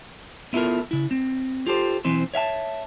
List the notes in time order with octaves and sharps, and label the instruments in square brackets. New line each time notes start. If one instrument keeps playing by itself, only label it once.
[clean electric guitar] B3 E4 F4 A4 A#4
C#3 E4
C4
F4 G4 A4 C5
B1 E3 C4 C5
C#5 E5 F5 A5